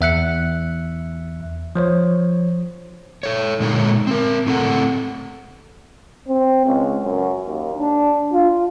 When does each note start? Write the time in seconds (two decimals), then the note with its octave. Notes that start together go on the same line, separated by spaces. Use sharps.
0.01 E2 E5 F#6 C#7
1.76 F3 C5 C#5
3.23 A4 C#5
3.60 A#2 D3 G#3 D#4 A4 C#5
4.07 C4 A#4
4.47 A2 C4 A4 F#5
6.28 C4
6.66 C#2
7.03 F#2
7.46 D#2
7.77 D4
8.33 F4